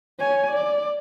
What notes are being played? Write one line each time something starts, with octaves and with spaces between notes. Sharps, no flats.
C#5 G#5
D5